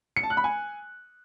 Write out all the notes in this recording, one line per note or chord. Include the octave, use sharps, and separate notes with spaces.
C#7
A5
F#6
B5
G#5